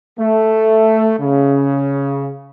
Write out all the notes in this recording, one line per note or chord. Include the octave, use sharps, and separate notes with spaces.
A3
C#3